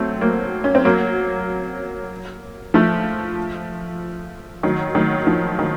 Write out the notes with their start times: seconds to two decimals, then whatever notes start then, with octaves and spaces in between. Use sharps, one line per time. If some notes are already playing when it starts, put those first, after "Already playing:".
Already playing: F#3 A3 C4
0.21 F#3 A#3
0.64 C#4
0.75 C4
0.85 F#3 A#3
2.74 F3 A3
4.63 D#3 F#3
4.95 D#3 F#3
5.27 F3
5.59 D#3